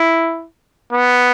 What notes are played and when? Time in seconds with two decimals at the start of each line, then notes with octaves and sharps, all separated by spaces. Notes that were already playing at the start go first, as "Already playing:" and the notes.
Already playing: E4
0.92 B3